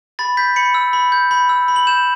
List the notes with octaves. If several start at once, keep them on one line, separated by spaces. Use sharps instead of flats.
B5 A6
G6 B6
B5 C#7
E6
B5
G6
B5
E6
B5
F#7
G6 E7